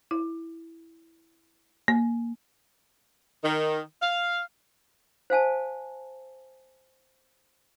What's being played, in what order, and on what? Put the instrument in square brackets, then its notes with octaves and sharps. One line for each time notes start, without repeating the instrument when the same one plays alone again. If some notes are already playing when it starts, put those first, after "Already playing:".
[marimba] E4
A#3
[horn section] D#3
F5
[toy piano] C5 F5 G#5 A5